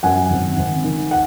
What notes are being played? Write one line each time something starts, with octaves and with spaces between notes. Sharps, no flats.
F#2 F#5 G#5
G#1
G#1
D#3
F#5